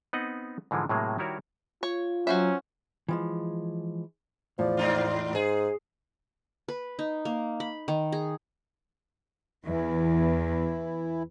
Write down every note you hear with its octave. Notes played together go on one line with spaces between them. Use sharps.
B3 C4 D#4 D#5 F#5
G#2 D3 E3 F3 G#3
A2 C3 F#3 G#3 A#3
D#3 G3 E4 F#4 A#4 C#5
F4 C#5
F#3 C#4 F#4 C5 E5
E3 F3 G#3
E2 A2 F3 D5
G#2 D#4 F4
G#2 G#4
B4
D#4
A#3
B5
D#3
G#4
E2 E3 E4